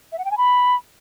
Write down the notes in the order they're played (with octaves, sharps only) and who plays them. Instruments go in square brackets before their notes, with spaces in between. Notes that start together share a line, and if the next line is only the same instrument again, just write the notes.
[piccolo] E5
F#5
G5
G#5
B5